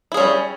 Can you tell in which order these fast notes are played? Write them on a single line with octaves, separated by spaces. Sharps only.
E4 G#4 C#4 G3